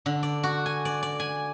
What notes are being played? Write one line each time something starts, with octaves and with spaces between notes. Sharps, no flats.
D3
D5
F#4
G#5
D5
D5
G#5